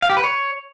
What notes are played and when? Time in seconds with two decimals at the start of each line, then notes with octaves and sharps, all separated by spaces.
0.02 F5
0.10 G4
0.17 B4
0.24 C#5